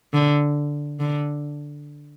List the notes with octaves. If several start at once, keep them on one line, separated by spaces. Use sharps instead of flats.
D3
D3